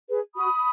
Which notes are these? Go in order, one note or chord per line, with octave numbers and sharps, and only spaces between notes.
G#4 B4
F#4 B5 D#6